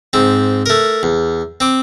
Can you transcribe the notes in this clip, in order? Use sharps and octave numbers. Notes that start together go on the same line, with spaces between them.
G#2 C4
A3 A#4
E2
C4 D6